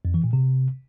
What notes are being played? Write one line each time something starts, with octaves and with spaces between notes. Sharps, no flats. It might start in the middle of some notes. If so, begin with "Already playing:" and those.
F2
E3
A#2
C3